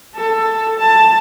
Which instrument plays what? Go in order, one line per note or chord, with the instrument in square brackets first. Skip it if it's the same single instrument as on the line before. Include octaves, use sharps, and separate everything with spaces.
[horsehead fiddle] A4
A5